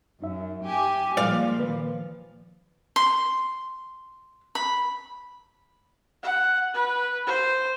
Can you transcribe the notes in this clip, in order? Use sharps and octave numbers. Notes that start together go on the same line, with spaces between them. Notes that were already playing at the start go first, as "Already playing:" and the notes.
F#2 D#4 E5
G4 G#5
A#2 F3 G3 G#3 D5 F5
D#3 A#3 B4
C6
B5
F#5
B4
C5